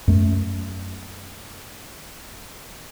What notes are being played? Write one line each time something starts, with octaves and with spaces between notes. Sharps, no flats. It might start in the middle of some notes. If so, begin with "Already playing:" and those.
F#2 A3